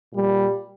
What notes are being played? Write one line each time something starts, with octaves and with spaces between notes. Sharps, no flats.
A#2 G3